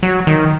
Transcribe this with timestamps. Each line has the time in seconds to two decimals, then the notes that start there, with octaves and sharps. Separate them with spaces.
0.03 F#3
0.27 D#3